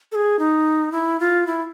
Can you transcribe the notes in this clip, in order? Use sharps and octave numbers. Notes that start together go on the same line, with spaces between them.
A4
G#4
D#4
E4
F4
E4